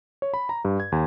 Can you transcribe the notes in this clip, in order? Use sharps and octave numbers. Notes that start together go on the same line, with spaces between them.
C#5
B5
A#5
G2
G#6
D#2